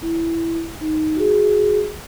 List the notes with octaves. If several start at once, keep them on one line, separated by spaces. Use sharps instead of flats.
E4
D#4
F#4 G#4